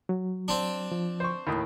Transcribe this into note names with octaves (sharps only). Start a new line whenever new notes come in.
F#3
C4 D4
F3
C5 C#6
D#2 A2 B5 D#6